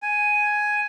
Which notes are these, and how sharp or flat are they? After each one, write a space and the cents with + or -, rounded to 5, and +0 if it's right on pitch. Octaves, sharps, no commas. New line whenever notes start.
G#5 +5